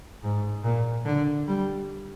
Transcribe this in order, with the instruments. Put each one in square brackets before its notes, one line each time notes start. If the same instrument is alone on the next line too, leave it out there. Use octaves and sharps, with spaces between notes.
[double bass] G#2
A#2
D3
G3